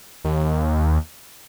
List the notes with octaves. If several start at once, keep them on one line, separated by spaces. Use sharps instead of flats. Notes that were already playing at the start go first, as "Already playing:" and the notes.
D#2